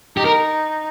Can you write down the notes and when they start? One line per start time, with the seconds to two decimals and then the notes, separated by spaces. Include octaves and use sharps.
0.17 D#4 G4
0.25 A#4